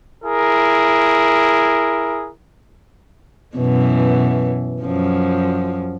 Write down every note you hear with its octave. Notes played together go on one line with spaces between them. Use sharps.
E4 G#4 A#4
F#2 B2 E3
F#2 F3